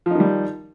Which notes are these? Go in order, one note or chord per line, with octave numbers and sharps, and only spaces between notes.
D#3 F3 G3 D#4